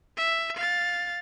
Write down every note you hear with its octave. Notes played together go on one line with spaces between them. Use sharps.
E5
F5 A6